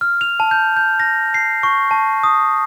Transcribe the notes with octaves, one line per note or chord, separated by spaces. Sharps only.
F6
F7
A5
G6
G6
A#6
C7
C#6
A5
D#6